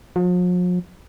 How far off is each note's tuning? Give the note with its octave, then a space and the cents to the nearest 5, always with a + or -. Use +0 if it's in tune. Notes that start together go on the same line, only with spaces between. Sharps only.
F3 +45